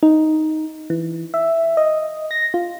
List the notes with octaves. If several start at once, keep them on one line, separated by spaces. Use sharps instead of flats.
D#4
E3
E5
D#5
A#6
F4